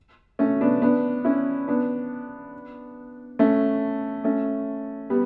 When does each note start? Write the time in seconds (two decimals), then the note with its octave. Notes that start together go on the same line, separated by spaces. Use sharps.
0.39 A3 C#4
0.61 B3 D4
0.82 B3 D4
1.24 C#4 E4
1.68 B3 D4
3.39 A3 C#4
4.24 A3 C#4
5.10 G3 B3